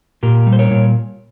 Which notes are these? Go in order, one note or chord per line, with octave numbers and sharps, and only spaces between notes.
A#2 G4 A#4
G3
C5
A#4 C#5
A#2